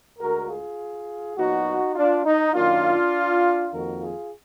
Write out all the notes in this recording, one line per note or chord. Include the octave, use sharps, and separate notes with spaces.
D2 D3 G#3 F#4 A#4
F4 G#4
A#2 F#3 B3 D#4 F#4
D4 F4
D#4
F#2 D#3 A#3 D4 F4
F2 D#3 A#3 F#4 A#4
F4 G#4